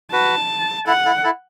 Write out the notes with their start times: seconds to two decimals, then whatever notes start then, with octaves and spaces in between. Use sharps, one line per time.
0.12 F#4 B4 A5
0.87 E4 A4 F#5
1.05 E4 A4
1.24 E4 A4